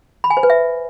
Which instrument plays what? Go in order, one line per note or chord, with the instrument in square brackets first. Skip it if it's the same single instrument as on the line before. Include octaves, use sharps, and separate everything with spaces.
[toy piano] B5
G#5
C5
B4
E5